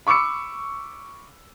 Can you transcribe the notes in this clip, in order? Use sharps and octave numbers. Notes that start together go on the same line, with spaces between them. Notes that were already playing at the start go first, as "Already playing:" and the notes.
B5 C#6 D6 E6 C#7